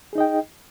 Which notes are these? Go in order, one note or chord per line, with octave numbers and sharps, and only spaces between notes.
D#4 G#4 D#5 G5